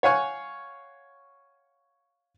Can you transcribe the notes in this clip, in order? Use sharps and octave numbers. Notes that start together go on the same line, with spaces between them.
C#5 F5 F#5 G#5 C#6